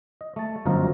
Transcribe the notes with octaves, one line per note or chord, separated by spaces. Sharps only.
D#5
A3 A5
G1 F#2 F3 A#4 D#5 A#5